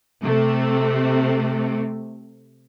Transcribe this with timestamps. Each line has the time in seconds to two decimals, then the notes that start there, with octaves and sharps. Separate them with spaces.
0.22 C3 A3